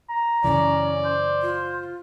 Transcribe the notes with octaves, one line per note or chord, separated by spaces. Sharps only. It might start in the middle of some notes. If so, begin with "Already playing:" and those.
A#5
F#2 C#3 E3 C#4 D5
C5
F4